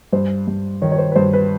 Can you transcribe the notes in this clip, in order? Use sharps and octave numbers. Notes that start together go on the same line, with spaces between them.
G2 C5
G2
D#3 C#5
C#5
C5
B4
G2 C5
B4